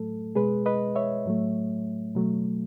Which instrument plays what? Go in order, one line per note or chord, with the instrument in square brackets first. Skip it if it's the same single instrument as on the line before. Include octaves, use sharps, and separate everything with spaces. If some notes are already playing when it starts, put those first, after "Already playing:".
Already playing: [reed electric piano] A2 F#3 A3 A4
B2 G#3 G#4 B4
B4 D#5
C#5 E5
A2 F#3 A3
B2 F#3 A3